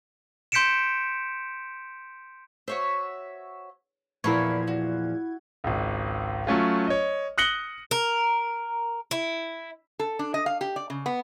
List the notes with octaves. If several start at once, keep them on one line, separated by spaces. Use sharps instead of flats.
C6 G6 B6 C#7 D7 E7
F#4 C5 C#5 E5
E2 A#2 F3 E4 A#4 B5 C#6 G#6
F#4
G#1 C#2
F#3 A3 C#4 F4
C#5 D#5
D#6 F#6 A#6 C#7 F#7 G7
A#4
E4
A4
D4
D#5
F5
G4
D5
C#3
B3